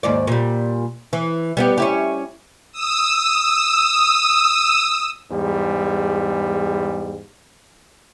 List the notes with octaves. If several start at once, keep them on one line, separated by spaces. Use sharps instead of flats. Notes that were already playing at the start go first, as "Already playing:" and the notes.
D#2 G#2 D5
A#2 G3
E3
G3 B3 G4
C#4 E4 G4
D#6 E6
E2 G#2 G3